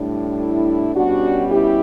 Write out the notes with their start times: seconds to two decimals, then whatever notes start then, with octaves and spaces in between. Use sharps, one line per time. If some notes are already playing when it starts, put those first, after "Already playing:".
Already playing: A2 G3 D4
0.40 E4
0.96 B2 G3 C#4 D4 F#4
1.51 E4 G4